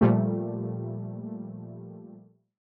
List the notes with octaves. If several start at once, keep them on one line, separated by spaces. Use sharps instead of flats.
A#2 F3 G3 A3